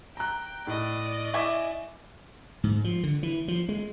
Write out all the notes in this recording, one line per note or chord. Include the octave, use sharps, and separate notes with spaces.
G5 A#5 F#6
A2 D5 D#5
E4 G#5 C#6 D6
G#2
F3
D3
E3
F3
G#3